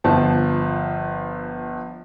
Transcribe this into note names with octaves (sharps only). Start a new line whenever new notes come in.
G1 F3 A5